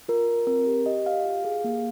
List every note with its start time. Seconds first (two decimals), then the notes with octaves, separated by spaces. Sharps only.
0.08 F4 A#4
0.28 F4
0.47 C4 A#4
0.67 G4
0.86 G4 D#5
1.06 G4 F5
1.25 F4
1.45 G#4
1.64 A#3